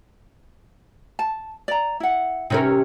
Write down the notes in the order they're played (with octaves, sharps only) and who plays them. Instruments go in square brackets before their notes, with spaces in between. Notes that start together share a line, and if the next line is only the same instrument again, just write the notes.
[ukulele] A5
D5 A#5
E4 F#5
[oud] C3 C#4 A#4 [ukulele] D#4 B4